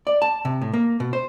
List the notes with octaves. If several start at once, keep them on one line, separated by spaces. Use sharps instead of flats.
D5
A5
C3
A2
A#3
B2
C5